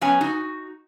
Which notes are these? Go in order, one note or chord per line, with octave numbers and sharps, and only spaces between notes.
F#3 B3 C#4 G#5
D#4 F#4